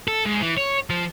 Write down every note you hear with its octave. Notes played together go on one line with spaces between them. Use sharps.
A4
G#2
E3
C#5
F3